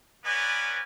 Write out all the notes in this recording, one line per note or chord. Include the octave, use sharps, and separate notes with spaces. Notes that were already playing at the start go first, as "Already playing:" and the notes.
B3 C#4 A#4 B4 D5 G#5